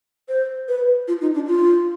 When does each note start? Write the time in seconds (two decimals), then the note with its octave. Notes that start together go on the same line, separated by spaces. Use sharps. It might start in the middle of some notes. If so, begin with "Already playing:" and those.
0.29 C5
0.68 B4
1.08 F4
1.21 D#4
1.34 D4
1.47 F4